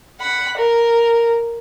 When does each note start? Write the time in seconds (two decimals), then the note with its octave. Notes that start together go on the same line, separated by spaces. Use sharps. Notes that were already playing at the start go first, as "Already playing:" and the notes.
0.20 F#5 B5
0.57 A#4